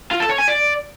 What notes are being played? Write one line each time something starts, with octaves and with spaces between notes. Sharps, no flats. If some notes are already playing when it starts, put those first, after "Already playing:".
F4
A4
C#5
G#5
D5